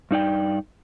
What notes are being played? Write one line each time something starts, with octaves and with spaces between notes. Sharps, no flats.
G2 D#4 D5 G5